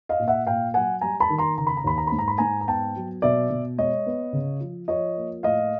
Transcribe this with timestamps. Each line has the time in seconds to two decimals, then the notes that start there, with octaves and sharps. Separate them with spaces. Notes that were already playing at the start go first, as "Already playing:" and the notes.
0.09 D#5 F5
0.20 A#2
0.28 E5 F#5
0.47 A#2 F5 G5
0.74 F#3 F#5 G#5
1.01 G3 G#5 A#5
1.20 A5 B5
1.30 D#3
1.38 A#5 C6
1.58 C#3 A#5
1.67 B5
1.77 A#5
1.84 D#2 B5
1.98 A#5
2.07 G#2 B5
2.19 A#5
2.28 B5
2.38 G#2 G#5 A#5
2.61 A#5
2.67 B3 G5 A5
2.96 F#3
3.22 B2 D5 E5
3.50 B2
3.78 G#3 C#5 D#5
4.06 B3
4.33 C#3
4.61 F3
4.88 F3 C#5 D#5
5.17 A#3
5.43 A2 D#5 F5